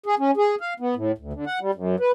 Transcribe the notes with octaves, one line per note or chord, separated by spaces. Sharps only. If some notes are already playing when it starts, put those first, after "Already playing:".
G#4
C#4
G#4
F5
B3
A2
D2
D3
F#5
G3
F#2
B4